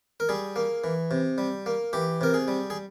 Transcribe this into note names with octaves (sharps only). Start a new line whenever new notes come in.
A#4
G3 G#4
A#3
E3
C3
G3
A#3
E3 G4
C3 A#4
G#4
G3
G#4